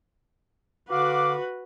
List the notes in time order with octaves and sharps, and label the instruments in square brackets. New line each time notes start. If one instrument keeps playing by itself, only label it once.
[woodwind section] D3 F5 D6 [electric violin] F#4 B4